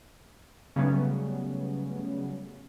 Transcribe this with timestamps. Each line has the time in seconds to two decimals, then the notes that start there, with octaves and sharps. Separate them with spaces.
0.76 C#3 F#3 G3 A3 B3 C#4